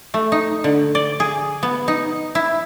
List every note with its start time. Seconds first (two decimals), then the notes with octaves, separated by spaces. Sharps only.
0.14 A3
0.32 D#4
0.64 D3
0.95 D5
1.20 G#4
1.63 B3
1.88 D#4
2.35 E4